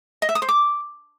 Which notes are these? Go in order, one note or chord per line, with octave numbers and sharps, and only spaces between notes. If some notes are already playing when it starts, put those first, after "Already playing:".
D#5
E5
D#6
C5
D6